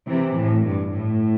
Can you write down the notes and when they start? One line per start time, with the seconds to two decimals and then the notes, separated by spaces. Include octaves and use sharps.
0.08 C3 E3
0.36 A2
0.65 G2
0.93 A2